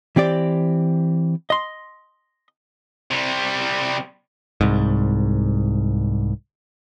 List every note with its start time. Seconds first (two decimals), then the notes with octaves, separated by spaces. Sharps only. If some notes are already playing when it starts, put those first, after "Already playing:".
0.16 E3 C4 G4 D5
1.50 D#5 C6
3.11 C3 G3
4.61 C2 G#2